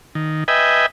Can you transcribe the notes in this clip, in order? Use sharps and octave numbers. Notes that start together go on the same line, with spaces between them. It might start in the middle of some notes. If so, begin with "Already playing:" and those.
D#3
B4 D#5 E5 G5 G#5